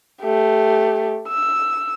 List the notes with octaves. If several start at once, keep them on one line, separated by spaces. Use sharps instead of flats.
A3 G4
E6